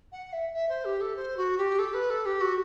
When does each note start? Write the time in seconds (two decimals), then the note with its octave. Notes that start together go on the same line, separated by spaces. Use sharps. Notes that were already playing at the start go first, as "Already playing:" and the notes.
0.12 F#5
0.33 E5
0.53 E5
0.69 C5
0.85 G4
1.01 A4
1.16 C5
1.37 F#4
1.58 G4
1.79 A4
1.94 B4
2.10 A4
2.25 G4
2.41 F#4